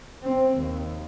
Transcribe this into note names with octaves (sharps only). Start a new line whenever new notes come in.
C4
D#2